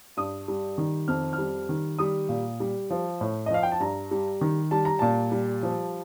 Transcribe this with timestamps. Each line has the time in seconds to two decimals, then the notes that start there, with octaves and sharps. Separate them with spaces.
0.17 G2 D#6
0.48 G3
0.78 D#3
1.08 F2 F6
1.33 F6
1.38 G3
1.69 D#3
1.99 G3 D#6
2.29 A#2
2.60 G3
2.90 F3
3.21 A2
3.46 D#5
3.51 F3 F5
3.63 G5
3.72 A5
3.80 G2 A#5
4.11 G3
4.41 D#3
4.71 G3 A5
4.85 A#5
4.99 A#2 A5
5.32 G3
5.63 F3